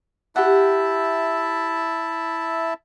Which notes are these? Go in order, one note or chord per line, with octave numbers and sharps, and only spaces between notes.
E4 G4 E5 F#5 A5